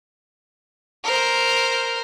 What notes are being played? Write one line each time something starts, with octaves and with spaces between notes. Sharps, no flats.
A#4 C5